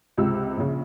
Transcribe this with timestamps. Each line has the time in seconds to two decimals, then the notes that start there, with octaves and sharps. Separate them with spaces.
0.17 C#2 C3 G#3 E6
0.57 A#1 C#3